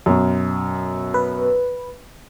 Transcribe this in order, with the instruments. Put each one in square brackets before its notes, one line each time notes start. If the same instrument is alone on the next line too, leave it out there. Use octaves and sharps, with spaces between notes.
[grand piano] F#2 B2
[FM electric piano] B4